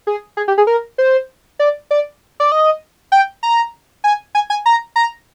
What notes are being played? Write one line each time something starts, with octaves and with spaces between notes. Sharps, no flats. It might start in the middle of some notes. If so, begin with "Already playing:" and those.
G#4
G#4
G4
G#4
A#4
C5
D5
D5
D5
D#5
G5
A#5
G#5
G#5
G#5
A#5
A#5